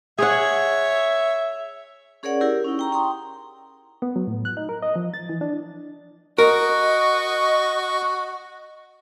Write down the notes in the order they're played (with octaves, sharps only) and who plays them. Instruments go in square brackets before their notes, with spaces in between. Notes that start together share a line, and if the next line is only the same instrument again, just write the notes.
[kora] G#4 F#5 [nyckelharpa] C#5 [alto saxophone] E5
[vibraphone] C#4 G#4 A#4 C#5 D5 F#5
E4 G4 A#4
C#4 D#4
G5 A#5 C#6
G5 C6 D#6
[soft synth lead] B3
F#3
A2
F#6
D#4
A#4
D#5
F3
A6
E3
D4
[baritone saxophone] F#4 [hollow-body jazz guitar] A#4 [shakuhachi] D#5 [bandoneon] C#6